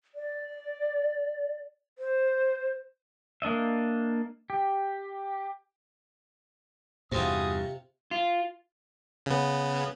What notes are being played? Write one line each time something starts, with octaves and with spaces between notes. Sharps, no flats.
D5
C5
A#3 D4 D#5 E5
G4
E2 G2 C3 C4 F4 F#4 G#4 D#6
F4
C#3 B3